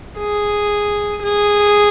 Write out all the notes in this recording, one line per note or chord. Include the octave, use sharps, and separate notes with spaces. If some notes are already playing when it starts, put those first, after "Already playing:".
G#4
G#4